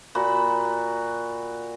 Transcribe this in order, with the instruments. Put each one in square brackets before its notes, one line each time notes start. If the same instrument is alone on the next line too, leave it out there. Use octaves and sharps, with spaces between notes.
[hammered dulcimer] A#2 F#4 B5